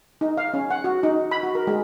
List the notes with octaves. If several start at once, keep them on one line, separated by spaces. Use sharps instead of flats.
D#4
F5
C#4
F#5
F#4
D#4
B5
F#4
A#4
G#3